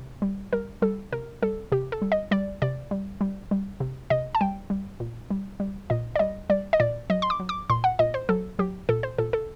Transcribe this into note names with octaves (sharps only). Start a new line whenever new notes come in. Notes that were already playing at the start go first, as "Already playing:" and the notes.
Already playing: C3
G3
G3 A#4
G3 A4
C3 A#4
G3 A4
C3 G4
A4
G3
D#5
G3 D5
C3 D5
G3
G3
G3
C3
C3 D#5
A5
G3 G5
G3
A#2
G3
G3
A#2 D#5
D5
G3 D#5
G3 D5
D#5
A#2 D5
F#3 D#5
C6
D6
F#3
D6
A#2 C6
F#5
A#2 D#5
C5
F#3 A4
F#3 G4
A#2 A4
C5
A#2 A4
A4